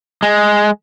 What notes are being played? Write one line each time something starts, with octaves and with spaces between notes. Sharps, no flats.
G#3